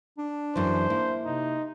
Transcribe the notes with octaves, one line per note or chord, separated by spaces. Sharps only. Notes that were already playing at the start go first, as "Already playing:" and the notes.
D4
F#2 E3 C5
A#3 E4
C3 D#4